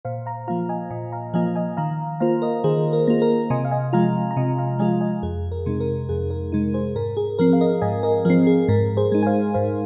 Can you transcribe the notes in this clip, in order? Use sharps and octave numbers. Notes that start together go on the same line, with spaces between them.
A#2 C5 F5
F5 A#5
F3 A#3 F4 F5 A#5
D#5 G#5
A#2 D#5 G#5
F5 A#5
F3 A#3 F4 D#5 G#5
D#5 G#5
D#3 F5 A#5
A#3 F4 C5 F5
A#4 D#5
D#3 G#4 C5
A#4
A#3 F4
A#4
C3 D#5 G#5
F5
D#5 G#5
F3 G#3 F4 F5 A#5
A#5
C3 D#5 G#5
F5 A#5
F3 G#3 F4 D#5 G#5
D#5 G#5
F2 G#4
A#4
C3 G#3 D#4
A#4
F2 G#4
A#4
C3 G#3 D#4
G#4 C5
G#2 A#4
G#4
F3 C4 A#4
F5
A#4 D#5
G#2 D#5 G#5
A#4 D#5
F3 C4 A#4
G#4
G#2 A#4
G#4 C5
G#3 D#4
G#5
C5 F5
G#2 C5 F5